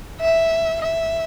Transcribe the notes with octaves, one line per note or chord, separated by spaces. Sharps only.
E5
E5